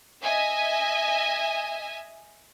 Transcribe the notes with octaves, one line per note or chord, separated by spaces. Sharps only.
D#5 E5 G#5